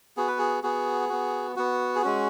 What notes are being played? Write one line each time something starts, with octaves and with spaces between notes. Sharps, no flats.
B3 F#4 G#4
B4
G#4
B3 F#4 G#4
B3 F#4
B3 F#4
G#4
G#3 C#4 F#4